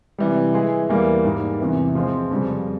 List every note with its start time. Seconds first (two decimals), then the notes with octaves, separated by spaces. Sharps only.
0.18 C3 E3 G3
0.54 E3 G#3 E4 G#4
0.89 E2 E3 G3 A#3
1.24 G#2 G3 A#3
1.60 E2 C3 E3
1.95 F3 G#3 C4
2.31 F2 C#3 G3